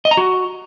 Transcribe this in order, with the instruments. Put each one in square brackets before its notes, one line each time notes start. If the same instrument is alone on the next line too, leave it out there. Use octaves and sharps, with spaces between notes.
[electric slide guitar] D#5
A#5
F#4